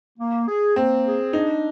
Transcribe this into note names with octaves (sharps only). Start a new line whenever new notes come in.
A#3
G#4
A#3 C4
G#4
D4 D#4